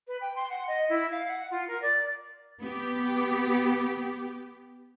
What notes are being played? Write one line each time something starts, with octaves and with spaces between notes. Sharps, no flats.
B4
G5
C6
F#5
D#5
E4
F5
F#5
F4
A#4
D5
B3 G4